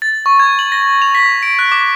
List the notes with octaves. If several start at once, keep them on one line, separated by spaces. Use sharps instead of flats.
A6
C#6
G#6
F#7
A#6
F7
B6
D7
F#6
D6